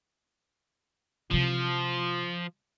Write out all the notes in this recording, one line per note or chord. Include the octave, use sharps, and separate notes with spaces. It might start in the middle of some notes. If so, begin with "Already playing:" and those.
C3 E3 F3